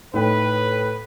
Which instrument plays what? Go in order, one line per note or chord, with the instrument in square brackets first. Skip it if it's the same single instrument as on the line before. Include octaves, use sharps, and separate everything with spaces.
[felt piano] A2 D#4 G5 [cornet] B4